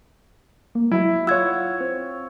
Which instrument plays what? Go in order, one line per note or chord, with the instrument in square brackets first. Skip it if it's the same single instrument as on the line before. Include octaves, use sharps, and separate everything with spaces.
[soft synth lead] A#3
[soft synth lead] F#3 [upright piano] E4
[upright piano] F4 C#5 [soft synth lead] F#5 [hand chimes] E6 G#6
[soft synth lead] C4